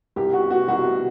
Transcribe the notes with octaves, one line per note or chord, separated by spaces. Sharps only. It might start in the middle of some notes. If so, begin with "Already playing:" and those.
C2 G4
B2 F#4
B2 F#4
C2 F#4
B2